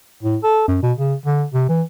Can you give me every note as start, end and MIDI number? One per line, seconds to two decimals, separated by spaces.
0.23 0.37 45
0.43 0.66 69
0.68 0.78 42
0.83 0.93 47
0.97 1.15 49
1.26 1.44 50
1.54 1.69 48
1.69 1.82 52